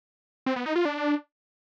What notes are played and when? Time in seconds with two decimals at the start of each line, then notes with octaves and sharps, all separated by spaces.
0.46 C4
0.56 B3
0.66 D#4
0.76 F4
0.85 D4